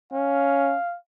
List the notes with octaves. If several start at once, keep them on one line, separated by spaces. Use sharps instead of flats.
C#4 F5